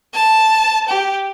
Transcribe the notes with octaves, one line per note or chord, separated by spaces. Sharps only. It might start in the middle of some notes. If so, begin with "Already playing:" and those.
A5
G4